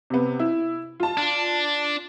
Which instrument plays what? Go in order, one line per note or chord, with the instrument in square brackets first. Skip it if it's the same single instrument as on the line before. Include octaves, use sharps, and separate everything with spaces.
[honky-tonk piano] C3 B3
E4
F4 A5
[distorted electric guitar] D4